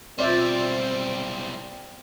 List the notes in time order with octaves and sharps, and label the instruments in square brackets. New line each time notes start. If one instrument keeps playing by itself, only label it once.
[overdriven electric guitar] B1 G3 [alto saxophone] C4 [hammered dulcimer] F4 [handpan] C5 D5 E5